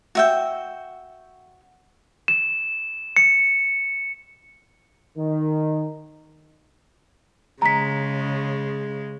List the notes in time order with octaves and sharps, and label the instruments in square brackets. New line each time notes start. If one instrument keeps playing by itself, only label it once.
[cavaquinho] F#4 E5 G5
[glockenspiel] E7
C#7
[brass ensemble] D#3
[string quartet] C#3 [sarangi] G#3 [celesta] A#5 B6